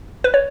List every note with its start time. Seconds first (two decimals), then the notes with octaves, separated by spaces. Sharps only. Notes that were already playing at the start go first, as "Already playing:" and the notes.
0.24 B4
0.34 C#5